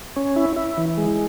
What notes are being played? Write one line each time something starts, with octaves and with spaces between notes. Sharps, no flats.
C#4
E4
E4
E3
G#3